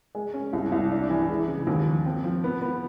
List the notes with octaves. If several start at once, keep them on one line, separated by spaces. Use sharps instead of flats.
G#3
C#4
C2
C2
D4
E3
G#3
C#3
D#2
F3
C4
F3
B3
B3